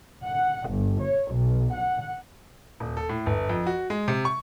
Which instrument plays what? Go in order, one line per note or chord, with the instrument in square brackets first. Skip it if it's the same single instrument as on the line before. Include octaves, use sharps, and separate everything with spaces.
[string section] F#5
G1
C#5
B1
F#5
[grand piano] D#1
A4
A2
G1
F2
F#4
G#3
C3
C#6